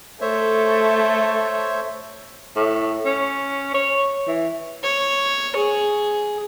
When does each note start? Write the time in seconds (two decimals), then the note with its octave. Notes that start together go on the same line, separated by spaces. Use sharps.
0.21 A3 A4 C5 C#5 E5
2.56 A2
3.05 C#4
3.74 C#5
4.27 E3
4.83 C#5
5.56 G#4